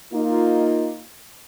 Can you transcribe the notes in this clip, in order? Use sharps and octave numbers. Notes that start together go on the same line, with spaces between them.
A#3 D#4 F4